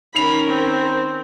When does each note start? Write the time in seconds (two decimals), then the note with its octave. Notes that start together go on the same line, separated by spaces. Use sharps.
0.15 D#3 C#4 A#4 B5 C7 F7
0.48 C4